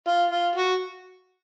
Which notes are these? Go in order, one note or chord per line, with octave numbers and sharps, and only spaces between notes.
F4
F4
F#4